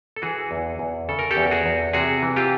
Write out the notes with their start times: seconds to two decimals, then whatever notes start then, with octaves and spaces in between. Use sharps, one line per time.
0.16 A4
0.22 E3 F#4 G#4
0.51 E2
0.79 E2
1.09 C#3 A4
1.19 A#4
1.31 G4 A4
1.37 E2
1.51 F#4 G#4
1.66 E2
1.93 C3 F#4 G#4
2.22 E3
2.36 F4 G4